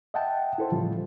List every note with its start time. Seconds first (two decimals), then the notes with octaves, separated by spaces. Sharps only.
0.14 D#5 E5 F#5 G5 A5
0.58 E4 A4 C5
0.72 A2 C#3 E3 F3 G3 F4